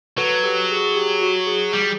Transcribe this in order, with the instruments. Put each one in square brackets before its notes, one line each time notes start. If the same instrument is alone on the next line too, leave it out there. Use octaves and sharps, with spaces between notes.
[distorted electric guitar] F#3 [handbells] A4 B4
[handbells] G4 A4
G#4
G#4
G4
F#4
G#4
[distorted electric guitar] G3